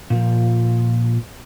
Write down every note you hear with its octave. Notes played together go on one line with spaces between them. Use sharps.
A#2 F3